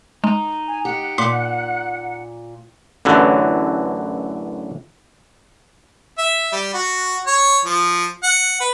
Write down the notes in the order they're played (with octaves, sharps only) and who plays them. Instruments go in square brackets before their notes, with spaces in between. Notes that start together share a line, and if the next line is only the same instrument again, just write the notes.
[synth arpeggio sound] G#3 [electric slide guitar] D#4
[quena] G#5
[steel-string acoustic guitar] G4 [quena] F#5
[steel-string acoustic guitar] A#2 [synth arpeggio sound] C6 D6 B6
[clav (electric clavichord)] A1 F#2 D3 E3 F#3
[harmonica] E5
G3
F#4
C#5
F3
F#5
B4